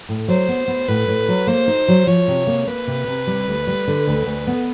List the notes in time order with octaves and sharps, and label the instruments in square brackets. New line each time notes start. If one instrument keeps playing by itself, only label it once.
[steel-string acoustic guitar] A2
[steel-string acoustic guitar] F#3 [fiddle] C5
[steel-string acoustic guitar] B3
B3
[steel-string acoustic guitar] A2 [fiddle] B4
[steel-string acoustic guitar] A2
F#3
[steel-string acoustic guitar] A#3 [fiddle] C5
[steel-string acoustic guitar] D#4
F#3
[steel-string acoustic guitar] F3 [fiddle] C#5
[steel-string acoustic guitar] C3
A#3
[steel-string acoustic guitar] A#3 [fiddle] B4
[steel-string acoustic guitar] C3
C3
G3
D2
G3
D3
D2
D2
B3